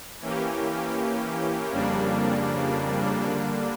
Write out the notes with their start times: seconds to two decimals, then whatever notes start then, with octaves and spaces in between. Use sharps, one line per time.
0.21 E3 A#3 C#4 G4
1.71 F2 C#3 G3 A#3 D4
3.22 D3 G3 A#3 D4